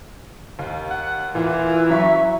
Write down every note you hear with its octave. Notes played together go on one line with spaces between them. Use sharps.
D#2
F#5
A#2 E3
F#3 E5 C#6